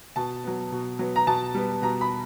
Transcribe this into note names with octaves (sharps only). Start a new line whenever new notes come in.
B2 A5
F#3 B3
B2
F#3 B3
A#5
B2 A5
G3 B3
B2 A#5
B5